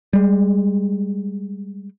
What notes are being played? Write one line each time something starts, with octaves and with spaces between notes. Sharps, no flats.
G3 G#3